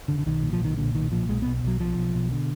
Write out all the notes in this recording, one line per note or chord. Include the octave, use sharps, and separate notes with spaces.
F1 D3
D3
B1 D#3
A#2
F3
B1 D#3
A#2 D3
B1 D#3
A#2 F3
B1 G#3
B3
B2
B1 F#3
B2 F3
B1
B2
D3